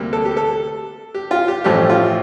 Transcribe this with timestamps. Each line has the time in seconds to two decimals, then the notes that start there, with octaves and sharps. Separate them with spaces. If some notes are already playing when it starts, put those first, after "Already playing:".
Already playing: D2 C3 G3 A#3
0.13 A4
0.25 G4
0.37 A4
1.14 G4
1.31 F4
1.48 G4
1.64 A1 G2 F3 A3 G4
1.90 F4